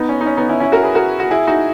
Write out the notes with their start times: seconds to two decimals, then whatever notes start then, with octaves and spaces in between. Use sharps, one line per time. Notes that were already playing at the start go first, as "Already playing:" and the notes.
Already playing: B3 D#4
0.09 C#4
0.21 D#4
0.26 C#4
0.37 B3 D#4
0.49 C#4 E4
0.60 C#4 E4
0.72 F#4 A#4
0.83 G#4 B4
0.95 F#4 A#4
1.20 F#4
1.31 E4 G#4
1.47 D#4 F#4